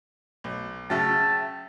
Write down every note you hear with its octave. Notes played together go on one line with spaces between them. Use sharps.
B1
C#3 F#3 E5 G5 A5